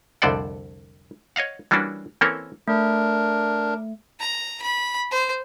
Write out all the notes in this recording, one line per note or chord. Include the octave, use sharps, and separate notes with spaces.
C2 F2 D3 C5 D5 F#5
C#5 D#5 F5 F#5
E3 G3 A#3 C#4 D4 F#4
E3 A#3 C4 C#4 A4 A#4
A3 D4 A#4
A#5
B5
C5